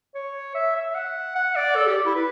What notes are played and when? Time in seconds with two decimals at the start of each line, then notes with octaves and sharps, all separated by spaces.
0.15 C#5
0.54 E5
0.76 E5
0.95 F#5
1.35 F#5
1.55 D5
1.76 A4
1.86 G4
2.06 E4
2.15 B4